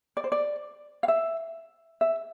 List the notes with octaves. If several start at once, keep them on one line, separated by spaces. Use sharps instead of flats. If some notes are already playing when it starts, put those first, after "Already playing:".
D5
C5
D5
F5
E5
E5